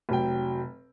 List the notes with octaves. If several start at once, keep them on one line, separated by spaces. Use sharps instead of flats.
F1 F#3 G5